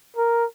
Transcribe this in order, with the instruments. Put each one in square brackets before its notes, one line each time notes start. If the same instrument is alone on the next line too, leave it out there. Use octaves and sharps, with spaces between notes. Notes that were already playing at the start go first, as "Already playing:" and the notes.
[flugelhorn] A#4